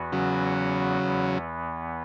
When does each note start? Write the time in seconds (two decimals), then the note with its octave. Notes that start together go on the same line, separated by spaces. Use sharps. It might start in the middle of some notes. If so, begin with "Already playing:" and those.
Already playing: E2 E3 B3 F#4
0.12 C#3 F#3
1.02 E2 E3 B3